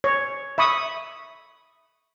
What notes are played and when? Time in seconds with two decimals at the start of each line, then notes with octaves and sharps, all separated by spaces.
0.04 C#5
0.58 E5 B5 C#6 D#6